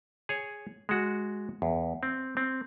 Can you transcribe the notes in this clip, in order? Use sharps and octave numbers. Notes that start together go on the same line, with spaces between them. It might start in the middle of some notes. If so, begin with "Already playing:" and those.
G#4 C#5
G#3 F#4
E2
C4
C4